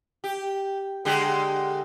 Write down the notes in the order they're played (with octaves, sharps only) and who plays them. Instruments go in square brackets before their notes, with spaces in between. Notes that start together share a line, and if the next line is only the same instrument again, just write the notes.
[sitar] G4
D3 G#3 G4